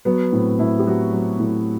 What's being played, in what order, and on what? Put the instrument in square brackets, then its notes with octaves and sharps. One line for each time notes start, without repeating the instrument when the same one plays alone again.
[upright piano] F#3 B3
A2 C4
A2 E4
G4
F#3 F#4
F#3
A2